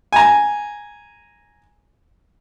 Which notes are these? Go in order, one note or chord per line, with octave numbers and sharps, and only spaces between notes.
G#5 A#5